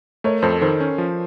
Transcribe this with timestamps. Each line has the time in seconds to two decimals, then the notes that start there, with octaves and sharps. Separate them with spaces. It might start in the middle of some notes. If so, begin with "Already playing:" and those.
0.24 A3 A#4 C#5
0.42 F2 A4 C5
0.61 D#3 A4 C5
0.80 C#4
0.98 F3